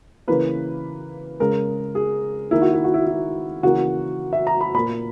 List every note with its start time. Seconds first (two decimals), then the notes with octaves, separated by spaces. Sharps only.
0.28 C#3 E3 A#3 B4
1.40 C#3 G#3 A#4
1.95 G#4
2.51 D#3 A#3 E4
2.62 F#4
2.74 E4
2.84 F#4
2.94 E4
3.07 E4
3.63 C#3 E3 A#3 F#4
4.33 E5
4.47 A#5
4.61 B5
4.74 A#2 A#3 B5